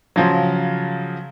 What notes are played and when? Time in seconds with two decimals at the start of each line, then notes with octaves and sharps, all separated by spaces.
0.16 C#3 F3 F#3